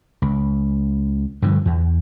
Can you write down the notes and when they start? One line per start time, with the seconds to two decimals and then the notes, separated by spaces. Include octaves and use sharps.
0.22 C#2
1.42 G2 D3 F3
1.66 E2